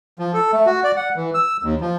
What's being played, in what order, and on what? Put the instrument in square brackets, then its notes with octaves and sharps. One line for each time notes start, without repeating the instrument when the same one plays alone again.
[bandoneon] F3
A4
A3
F#4
D5
F#5
E3
E6
D#2
F3